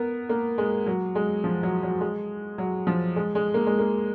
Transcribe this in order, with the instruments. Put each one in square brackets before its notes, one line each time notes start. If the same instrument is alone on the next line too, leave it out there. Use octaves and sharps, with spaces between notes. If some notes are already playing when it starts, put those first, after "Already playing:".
Already playing: [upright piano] B3 A#4
A#3
G#3
F#3
G#3
F3
F#3
F#3
G#3
F#3
F3
G#3
G#3
A#3
G#3
A#3